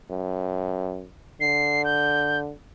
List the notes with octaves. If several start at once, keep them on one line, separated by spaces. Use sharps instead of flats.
F#2
D3 C7
G6